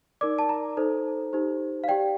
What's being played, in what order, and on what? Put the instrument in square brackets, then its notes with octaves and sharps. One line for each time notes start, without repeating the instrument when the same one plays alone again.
[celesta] D#4 A#4 D5 D6
A5
A#5
D#4 A4 C5
D#4 G4 C5
F5
G4 D5 G5